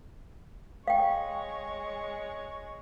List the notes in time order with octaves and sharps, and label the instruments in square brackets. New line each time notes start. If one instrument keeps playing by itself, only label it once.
[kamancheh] G#3 C#5 [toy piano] F5 G5